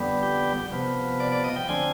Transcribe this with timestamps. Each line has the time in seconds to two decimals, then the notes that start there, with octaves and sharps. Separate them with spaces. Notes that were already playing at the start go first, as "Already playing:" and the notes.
Already playing: F2 D3 G3 B3
0.23 G4
0.72 C3 F3 B3
1.20 D5
1.32 D5
1.44 D#5
1.56 G5
1.68 D2 D3 F3 C4 G#5